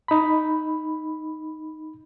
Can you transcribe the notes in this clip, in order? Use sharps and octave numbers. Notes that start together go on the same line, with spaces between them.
D#4 B5